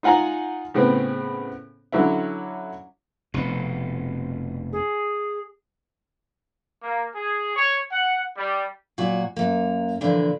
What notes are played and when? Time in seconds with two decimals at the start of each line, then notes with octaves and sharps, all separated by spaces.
0.03 D#4 F4 F#5 G#5 A#5
0.74 A2 C#3 B3 C4
1.92 D3 F#3 C#4 E4
3.34 F1 B2
4.72 G#4
6.83 A#3
7.13 G#4
7.54 C#5
7.90 F#5
8.35 G3
8.98 A#2 F#3 F#4
9.36 F#2 A#3
10.01 A#2 D3 E3 F3 D4